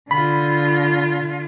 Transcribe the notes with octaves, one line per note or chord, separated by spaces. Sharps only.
D3 F4 B5